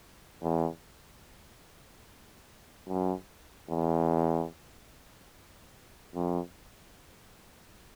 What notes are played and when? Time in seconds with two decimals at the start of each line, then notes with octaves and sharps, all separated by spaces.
0.43 E2
2.88 F#2
3.70 E2
6.15 F2